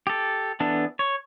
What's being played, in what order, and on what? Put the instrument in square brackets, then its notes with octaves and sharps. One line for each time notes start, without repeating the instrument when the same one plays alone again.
[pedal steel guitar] G4 A4
E3 B3 D4 A4
C#5